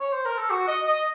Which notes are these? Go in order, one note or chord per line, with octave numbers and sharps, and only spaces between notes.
C#5
C5
A#4
A4
F#4
D#5
D#5